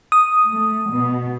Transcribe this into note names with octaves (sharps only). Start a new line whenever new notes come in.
D#6
A3
B2